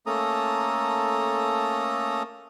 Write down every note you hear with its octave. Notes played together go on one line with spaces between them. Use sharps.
A3 A#3 C#4 A4 A#5 D#6